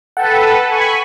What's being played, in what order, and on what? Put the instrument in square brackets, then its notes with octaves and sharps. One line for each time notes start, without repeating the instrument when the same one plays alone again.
[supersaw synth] A4 B4 [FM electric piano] F#5 G5
[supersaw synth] G#5 B5 C#6